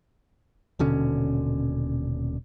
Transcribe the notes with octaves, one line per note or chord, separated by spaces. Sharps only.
D#1 B2 D3 C#4